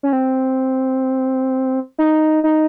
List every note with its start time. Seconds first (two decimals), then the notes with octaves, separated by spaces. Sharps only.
0.03 C#4
0.13 C4
1.98 D#4
2.44 D#4